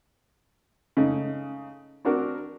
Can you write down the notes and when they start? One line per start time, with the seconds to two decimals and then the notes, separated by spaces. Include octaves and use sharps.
0.97 C#3 G#3 A3 D#4
2.05 C4 D4 F#4 A#4